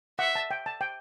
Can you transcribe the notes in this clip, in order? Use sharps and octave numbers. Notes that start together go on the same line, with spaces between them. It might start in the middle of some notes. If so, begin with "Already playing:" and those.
E5 F#5
A5
G5
A5
G5